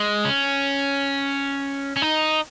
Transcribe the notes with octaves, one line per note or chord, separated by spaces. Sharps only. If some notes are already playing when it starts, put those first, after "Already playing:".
Already playing: G#3
C#4
C#4
D#4